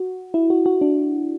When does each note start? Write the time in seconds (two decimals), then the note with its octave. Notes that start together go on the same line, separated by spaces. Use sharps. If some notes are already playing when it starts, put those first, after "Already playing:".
Already playing: F#4
0.34 E4
0.50 F#4
0.66 F#4
0.81 D4